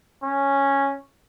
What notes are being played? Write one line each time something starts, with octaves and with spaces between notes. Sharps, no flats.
C#4